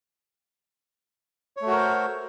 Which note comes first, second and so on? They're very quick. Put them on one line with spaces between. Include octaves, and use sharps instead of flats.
C#5 A3 F#4 A#4 C5